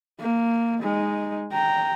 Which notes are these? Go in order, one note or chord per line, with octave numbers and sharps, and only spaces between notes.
A#3
G#3 D#4
G5 A#5